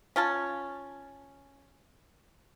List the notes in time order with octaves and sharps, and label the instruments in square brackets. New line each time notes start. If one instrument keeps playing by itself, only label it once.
[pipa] C#4 F4 A5